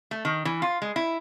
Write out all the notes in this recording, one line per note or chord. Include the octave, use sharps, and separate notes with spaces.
A3
D#3
E3
F4
G#3
E4